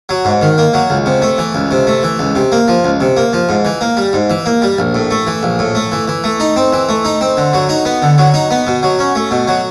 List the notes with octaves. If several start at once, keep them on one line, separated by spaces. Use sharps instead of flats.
F#3
G#2
D#3
A#3
F#3
C#2
C3
A3
E3
C#2
C3
A3
E3
C#2
C3
A#3
F3
C#2
C3
A#3
F3
G#2
E3
A#3
G3
G#2
E3
A#3
G3
A#1
A2
A3
E3
A#1
A2
A3
E3
E3
A3
D#4
C4
E3
A3
D#4
C4
D3
F#3
D#4
B3
D3
F#3
D#4
B3
B2
F#3
C#4
A3
B2
F#3